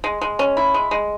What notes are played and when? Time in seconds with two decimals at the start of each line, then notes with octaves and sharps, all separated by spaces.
0.04 G#3
0.21 G#3
0.39 C#4
0.57 E4
0.74 G#3
0.91 G#3